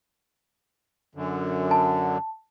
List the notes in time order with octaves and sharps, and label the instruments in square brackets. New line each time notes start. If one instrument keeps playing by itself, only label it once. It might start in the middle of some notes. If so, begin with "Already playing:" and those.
[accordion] F#2 D3
[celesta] A5